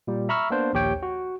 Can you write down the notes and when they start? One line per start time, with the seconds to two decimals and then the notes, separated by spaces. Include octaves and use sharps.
0.07 A#2 G3
0.29 E5 A#5 B5 C#6 E6 F6
0.50 A#3 B3 D4 C5
0.73 A#1 D#2 G4 C#5 G5
1.03 F#4